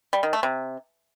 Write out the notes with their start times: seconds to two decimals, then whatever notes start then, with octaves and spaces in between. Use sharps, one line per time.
0.13 G3
0.23 D#3
0.33 A3
0.43 C3